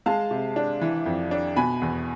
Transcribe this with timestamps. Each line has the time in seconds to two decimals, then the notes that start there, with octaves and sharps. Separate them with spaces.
0.06 G#3 F5 A5
0.31 C3
0.56 D4
0.82 E3
1.06 F2
1.31 D4
1.56 B2 G#5 B5
1.82 E2